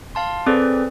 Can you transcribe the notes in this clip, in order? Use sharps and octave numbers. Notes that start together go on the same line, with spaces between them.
F5 A5 C6
C4 G#4 A4 B4 D5